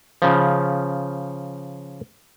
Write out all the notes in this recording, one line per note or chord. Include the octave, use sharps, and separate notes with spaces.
C#3 F3